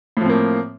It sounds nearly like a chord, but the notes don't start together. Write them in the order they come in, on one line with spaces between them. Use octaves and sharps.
A2 F3 C4 A#3